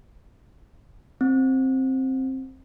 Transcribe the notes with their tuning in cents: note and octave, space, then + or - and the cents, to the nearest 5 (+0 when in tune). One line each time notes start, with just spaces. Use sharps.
C4 +10